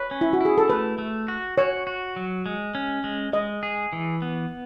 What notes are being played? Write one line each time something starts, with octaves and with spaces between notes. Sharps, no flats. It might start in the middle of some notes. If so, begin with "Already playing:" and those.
Already playing: B4 C#5
C#4
E4
F#4
E4 G#4
A4
A3 B4
A3
F#4
F#4 C#5
F#4
F#3
G#3
C#4
G#3
G#3 D#5
G#4
E3
B3